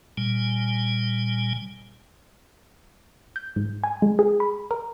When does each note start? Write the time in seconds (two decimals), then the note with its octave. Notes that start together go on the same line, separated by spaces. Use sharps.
0.18 A#2 G3 G#5
3.36 G6
3.56 G#2
3.84 G#5
4.02 G#3
4.19 G#4
4.40 B5
4.71 A#4